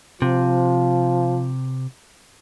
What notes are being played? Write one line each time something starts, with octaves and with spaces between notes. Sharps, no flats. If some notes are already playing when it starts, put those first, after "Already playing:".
C3 F3